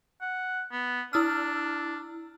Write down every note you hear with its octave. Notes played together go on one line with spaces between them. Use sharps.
F#5
B3
D4 E4 E6 F6